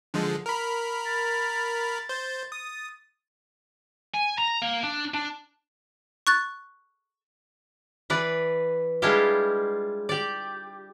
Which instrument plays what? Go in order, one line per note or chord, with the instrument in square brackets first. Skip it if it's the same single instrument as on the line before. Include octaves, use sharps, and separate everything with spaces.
[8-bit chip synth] D3 F3 G#3
A#4 B5
[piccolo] A6
[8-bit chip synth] C5
D#6
[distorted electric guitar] G#5
A#5
A#3
D4
D4
[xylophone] C#6 F#6 A6
[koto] E3 B4 D5
G3 G#3 D4 E4 F4 G4
G4 D5